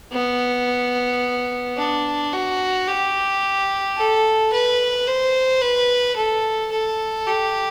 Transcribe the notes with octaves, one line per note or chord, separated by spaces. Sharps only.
B3
D4
F#4
G4
A4
B4
C5
B4
A4
A4
G4